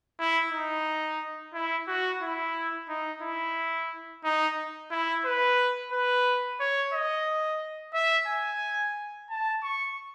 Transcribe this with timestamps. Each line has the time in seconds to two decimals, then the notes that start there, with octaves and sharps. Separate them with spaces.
0.20 E4
0.53 D#4
1.54 E4
1.88 F#4
2.22 E4
2.89 D#4
3.22 E4
4.24 D#4
4.91 E4
5.25 B4
5.92 B4
6.60 C#5
6.94 D#5
7.94 E5
8.28 G#5
9.30 A5
9.63 C#6